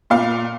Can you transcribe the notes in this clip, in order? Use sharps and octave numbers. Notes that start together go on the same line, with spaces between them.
A#2 F5